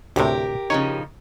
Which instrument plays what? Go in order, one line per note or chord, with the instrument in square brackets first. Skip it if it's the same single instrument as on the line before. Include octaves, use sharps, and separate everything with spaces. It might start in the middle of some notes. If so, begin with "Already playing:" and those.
[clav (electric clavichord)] D2 A2 C3 [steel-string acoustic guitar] G4 A#4
[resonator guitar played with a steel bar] C#3 F3 D#4 [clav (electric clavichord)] C#5